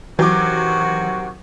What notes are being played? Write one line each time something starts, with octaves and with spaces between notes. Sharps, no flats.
C3 D#3 E3 F#3 F#4 D6